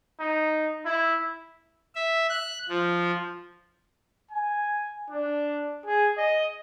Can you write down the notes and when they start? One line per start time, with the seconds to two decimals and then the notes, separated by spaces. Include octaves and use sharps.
0.20 D#4
0.85 E4
1.95 E5
2.29 F#6
2.69 F3
4.31 G#5
5.10 D4
5.86 G#4
6.17 D#5